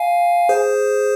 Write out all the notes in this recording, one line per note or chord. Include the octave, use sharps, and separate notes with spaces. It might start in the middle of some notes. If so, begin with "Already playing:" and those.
Already playing: F5 G#5
G#4 C5